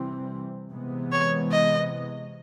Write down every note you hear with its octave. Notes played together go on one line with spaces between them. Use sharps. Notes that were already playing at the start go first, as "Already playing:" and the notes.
Already playing: C3 E3 G3 C4
C3 E3 G#3 B3
C#5
D#5